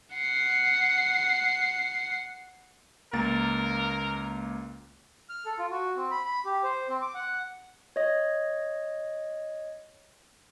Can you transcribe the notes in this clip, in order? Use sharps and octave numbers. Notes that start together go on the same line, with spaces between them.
F#5 C7
C#2 A#3 A#4 A6
F6
A4
F4
F#4
C4
B5
B5
G4
C5
C4
D6
F#5
C#5 D#5